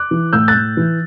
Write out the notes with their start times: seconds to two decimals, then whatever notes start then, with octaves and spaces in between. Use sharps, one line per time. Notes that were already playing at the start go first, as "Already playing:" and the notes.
Already playing: D6 F#6
0.11 E3
0.33 A2 E6 G6
0.48 F#6 A6
0.55 A2
0.77 E3